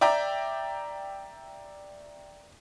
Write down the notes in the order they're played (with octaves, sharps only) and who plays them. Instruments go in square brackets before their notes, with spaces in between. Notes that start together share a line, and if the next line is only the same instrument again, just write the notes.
[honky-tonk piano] D5 E5 G5 A#5 D6